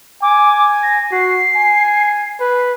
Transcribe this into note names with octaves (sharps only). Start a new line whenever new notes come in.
G#5 D6
A#6
F#4 C7
G#5
B4